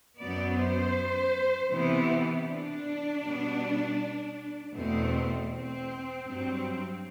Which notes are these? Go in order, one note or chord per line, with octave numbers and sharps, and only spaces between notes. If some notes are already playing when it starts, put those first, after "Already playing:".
F#2 F#3 B3 D5
C5
C3 E3 B3
D4
B2 G3 B3
E2 B2 A3 C4
C4
G2 F#3 C4